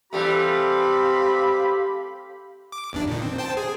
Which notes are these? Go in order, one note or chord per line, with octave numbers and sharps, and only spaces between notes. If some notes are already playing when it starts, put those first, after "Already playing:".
E3 G3 A3 C4 G4 F5 B5
D6
G1 E2 D4
A#2 D#3
C4
C5 G5 A5
G#4